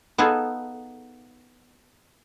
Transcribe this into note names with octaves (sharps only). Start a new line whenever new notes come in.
B3 D#4 F4 G#4 A4